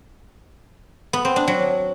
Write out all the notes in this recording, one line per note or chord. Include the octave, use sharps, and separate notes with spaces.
B3
C4
D4
F#3